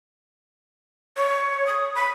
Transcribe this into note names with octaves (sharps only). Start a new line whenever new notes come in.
C#5
D#6
B5